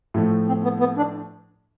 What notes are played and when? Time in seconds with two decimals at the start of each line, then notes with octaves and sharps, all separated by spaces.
0.14 A2 F3 A3
0.48 C4
0.63 B3
0.80 B3
0.97 D4